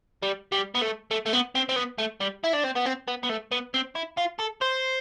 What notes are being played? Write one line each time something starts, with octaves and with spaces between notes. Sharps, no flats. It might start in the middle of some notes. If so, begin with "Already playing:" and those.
G3
G3
B3
A3
A3
A3
B3
C4
C4
B3
A3
G3
E4
D4
C4
B3
C4
B3
B3
A3
B3
C4
E4
F4
A4
C5